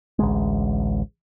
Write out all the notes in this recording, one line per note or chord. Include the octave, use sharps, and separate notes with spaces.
A1 D2 G#3